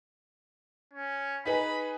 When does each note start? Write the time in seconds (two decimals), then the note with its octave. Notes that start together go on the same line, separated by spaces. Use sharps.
0.93 C#4
1.45 D#4 G#4 B4 B5